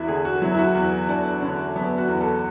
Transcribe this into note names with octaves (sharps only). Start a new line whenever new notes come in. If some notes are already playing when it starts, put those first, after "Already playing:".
Already playing: E2 E4 F#4
D3 G#4
F#4
F#3 E4
E4
F#4
E2 F#4
E2 D4
D3 C#4
F#3 B3
F#4
E2
A4